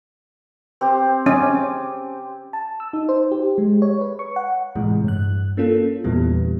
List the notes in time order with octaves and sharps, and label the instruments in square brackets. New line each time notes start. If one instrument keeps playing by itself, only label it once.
[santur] C4 G4 C5
[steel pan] C#4 [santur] D6
[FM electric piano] A5
E6
D#4
C5
G4
G#3
C#5
B4
C#6
F#5
A2 C3 E3 G#3
G2 F#6
A#3 C#4 F4 A4
E2 A#2 E3 G3 B3